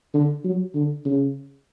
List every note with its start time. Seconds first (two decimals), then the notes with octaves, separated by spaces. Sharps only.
0.14 D3
0.44 F#3
0.75 D3
1.05 C#3